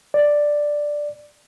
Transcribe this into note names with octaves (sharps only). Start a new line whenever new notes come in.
D5